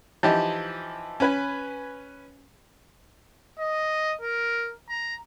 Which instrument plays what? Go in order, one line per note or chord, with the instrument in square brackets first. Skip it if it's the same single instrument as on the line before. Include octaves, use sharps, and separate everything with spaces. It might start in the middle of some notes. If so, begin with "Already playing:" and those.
[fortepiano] E3 F3 D#4 G4
C#4 B4 G#5
[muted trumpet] D#5
A#4
A#5